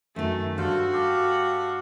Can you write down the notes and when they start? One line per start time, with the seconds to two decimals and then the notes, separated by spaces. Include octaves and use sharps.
0.16 F#2 D#3 A3
0.58 G2 F#4 A4 C5 F5
0.93 G4 A4 F5